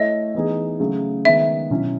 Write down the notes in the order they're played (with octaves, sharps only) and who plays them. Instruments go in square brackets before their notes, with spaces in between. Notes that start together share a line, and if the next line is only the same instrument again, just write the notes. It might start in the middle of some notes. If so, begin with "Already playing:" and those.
Already playing: [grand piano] A3 E4 A4 C#5 E5 [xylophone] D#5
[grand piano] E3 B3 D#4 G#4
C#3 F#3 A3
[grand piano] D#3 G#3 B3 [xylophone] E5
[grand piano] B2 F#3 C#4 E4